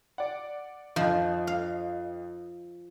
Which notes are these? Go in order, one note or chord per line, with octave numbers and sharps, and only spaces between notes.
D5 F#5
F2 F3 D#4
F5